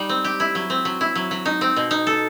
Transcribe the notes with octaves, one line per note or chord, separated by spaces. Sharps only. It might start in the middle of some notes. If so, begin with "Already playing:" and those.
Already playing: G3 D#4
C4
G4
E4
F#3
C4
F#3
E4
F#3
F#3
D#4
C4
B2
D#4
A4